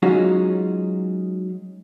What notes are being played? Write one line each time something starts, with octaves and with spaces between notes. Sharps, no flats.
F#3 G#3 C#4 D#4 F4 F#4